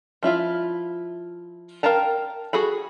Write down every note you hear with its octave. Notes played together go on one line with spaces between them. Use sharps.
F3 E4 F4 E5
A#4 F5 G5 A5 A#5
F#4 G#4 A4 B5